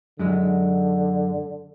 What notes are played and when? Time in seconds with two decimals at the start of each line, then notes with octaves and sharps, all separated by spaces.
0.19 F#2 D3 G#3